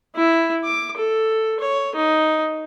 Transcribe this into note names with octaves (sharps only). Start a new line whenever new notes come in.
E4
D6
A4
C#5
D#4